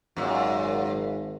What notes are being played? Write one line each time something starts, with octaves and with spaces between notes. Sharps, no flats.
G#1 F#2 A#2